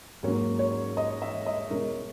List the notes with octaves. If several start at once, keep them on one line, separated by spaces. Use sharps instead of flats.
G#2 F#3 A#3 C#4
C#5
D#5
E5
D#5
B2 G#3 C#4 A#4